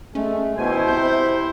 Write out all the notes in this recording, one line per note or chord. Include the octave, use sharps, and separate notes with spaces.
G#3 A3 C#4
E1 B2 D#3 E4 C5 G#5
C#2 C3 G6